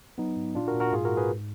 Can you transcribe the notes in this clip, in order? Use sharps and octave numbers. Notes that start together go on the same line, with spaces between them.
F#3 B3 D#4
G#2
A#2 D4 F4
F#4 A#4
A#2
F#4 A#4
G#2 F4 G#4
F#4 A#4
G#2
G#4 B4